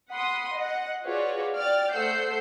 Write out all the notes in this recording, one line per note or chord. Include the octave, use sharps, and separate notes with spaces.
F#5 B5 C6 D#6
D#5 F#5
F4 F#4 G#4 B4 C#5 D5
D5 G5 F6 A6
A3 C5 F#5 E6 G6 C7